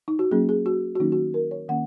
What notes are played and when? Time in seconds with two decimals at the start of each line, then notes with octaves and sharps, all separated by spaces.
0.08 D#4
0.19 F#4
0.31 F#3 A#3 C#4 G#4
0.49 G#4
0.66 F#4
0.95 F#4
1.00 D#3 F#3 A#3 C#4 D#4
1.12 F#4
1.34 A#4
1.51 C#5
1.68 D#3 A#3 C#4 F#5